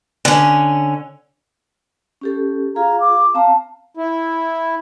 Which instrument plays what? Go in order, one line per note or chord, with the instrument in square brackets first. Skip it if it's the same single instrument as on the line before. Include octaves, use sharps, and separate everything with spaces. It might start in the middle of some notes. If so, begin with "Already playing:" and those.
[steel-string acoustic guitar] D3 C#4
[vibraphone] C#4 G4 A4
[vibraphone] F4 G#4 F5 [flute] A#5
[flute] D6
[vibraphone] C4 A5 A#5 [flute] F5
[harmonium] E4